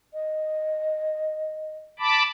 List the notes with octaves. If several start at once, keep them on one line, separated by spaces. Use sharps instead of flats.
D#5
A5 B5 D6